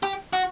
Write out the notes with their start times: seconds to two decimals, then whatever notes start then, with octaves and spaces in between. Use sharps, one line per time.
0.03 G4
0.33 F#4